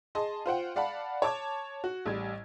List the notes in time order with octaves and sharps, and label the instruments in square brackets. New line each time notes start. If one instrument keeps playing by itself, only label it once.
[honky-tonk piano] G#4 D#5 A5 C6
F4 C5 F#5 G5
D5 F5 F#5 A5 B5
C#5 A5 D6 G#6
F#4
A1 G3 G#6